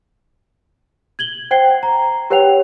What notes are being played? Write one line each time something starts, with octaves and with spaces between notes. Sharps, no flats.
G#6 F#7 G7
C5 F#5 G5 G#6 C7 G7
A#5
G4 B4 C#5 F#5 G5 F7